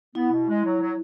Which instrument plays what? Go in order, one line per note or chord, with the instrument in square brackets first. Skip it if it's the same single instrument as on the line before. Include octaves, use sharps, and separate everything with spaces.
[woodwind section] B3 [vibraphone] E4
[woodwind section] B2
G#3
F#3
F#3